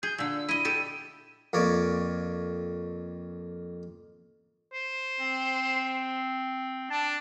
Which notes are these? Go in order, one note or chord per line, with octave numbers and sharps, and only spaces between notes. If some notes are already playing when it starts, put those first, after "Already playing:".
G#4 G6
A#2 D3 E6
E4 D#5 D#7
G4 A4
F2 A#3 C#5 D5
C5
C4
D4 A5